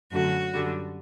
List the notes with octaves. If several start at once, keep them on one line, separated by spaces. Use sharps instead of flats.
F#2 D3 F#3 A3 F#4
F#2 D3 G3